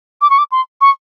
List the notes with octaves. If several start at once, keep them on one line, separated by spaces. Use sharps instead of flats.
D6
C#6
D6
C6
C#6